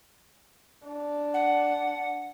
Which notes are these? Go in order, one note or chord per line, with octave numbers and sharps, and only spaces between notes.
D4
F#5